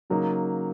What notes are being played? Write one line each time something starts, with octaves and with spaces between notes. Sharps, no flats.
C#3 F#3 A#3 D#4